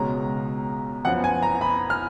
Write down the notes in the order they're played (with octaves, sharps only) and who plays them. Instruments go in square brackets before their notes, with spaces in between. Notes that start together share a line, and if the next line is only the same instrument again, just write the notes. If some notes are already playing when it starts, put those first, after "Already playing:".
Already playing: [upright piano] C#2 B2 G#3 C#4 A#5
F#2 F3 B3 F#5
G#5
A#5
B5
F6